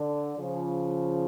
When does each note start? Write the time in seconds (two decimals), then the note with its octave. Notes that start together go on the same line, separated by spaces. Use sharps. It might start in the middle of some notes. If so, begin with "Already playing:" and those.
Already playing: D3
0.38 C#3 F3